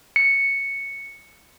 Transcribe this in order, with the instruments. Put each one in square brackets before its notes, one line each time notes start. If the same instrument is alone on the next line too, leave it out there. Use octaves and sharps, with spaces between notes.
[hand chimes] C#7